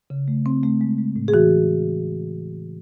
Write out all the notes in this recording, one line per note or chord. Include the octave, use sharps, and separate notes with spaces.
C#3
A3
C4
A3
G#3
G#3
A2
G#4
E3 F#4